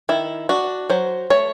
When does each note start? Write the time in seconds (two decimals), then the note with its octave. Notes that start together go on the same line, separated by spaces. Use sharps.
0.09 D#3 E4
0.49 D4 F#4
0.90 F#3 C5
1.30 A3 C#5